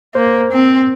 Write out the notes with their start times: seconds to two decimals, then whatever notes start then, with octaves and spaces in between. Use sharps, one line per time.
0.15 A#3 C5
0.52 C4